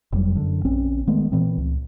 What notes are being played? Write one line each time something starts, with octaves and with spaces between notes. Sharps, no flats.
F1 F2 F#3 G3
F#2 D3
A#1 C4 C#4
D#3 G#3 A3 B3
A#2 E3 C4
C#2